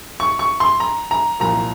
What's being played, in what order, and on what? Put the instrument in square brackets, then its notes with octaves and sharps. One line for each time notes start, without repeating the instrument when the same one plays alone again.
[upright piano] C#6
C#6
C6
A#5
A#5
C2 A#2 F3 A#5